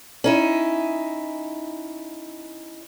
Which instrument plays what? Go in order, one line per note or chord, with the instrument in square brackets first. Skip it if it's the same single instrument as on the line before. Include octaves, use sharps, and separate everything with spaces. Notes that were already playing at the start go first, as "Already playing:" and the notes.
[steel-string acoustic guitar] C#4 D#4 E4